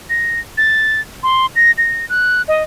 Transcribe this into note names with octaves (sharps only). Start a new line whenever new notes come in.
A#6
A6
C6
A#6
A#6
F#6
D#5